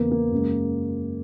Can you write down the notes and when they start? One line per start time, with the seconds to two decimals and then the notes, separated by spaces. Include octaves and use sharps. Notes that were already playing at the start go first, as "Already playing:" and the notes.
Already playing: E2 C#3 E3 A#3 B3
0.11 A#3
0.31 F#2 C#3 G#3